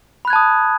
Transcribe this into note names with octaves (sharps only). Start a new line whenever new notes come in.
A5 B5 D#6 F#6 G#6